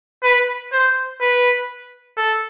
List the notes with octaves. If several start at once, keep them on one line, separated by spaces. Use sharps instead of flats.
B4
C5
B4
A4